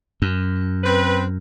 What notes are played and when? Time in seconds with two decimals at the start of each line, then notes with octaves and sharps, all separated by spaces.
0.22 F#2
0.84 C4 B4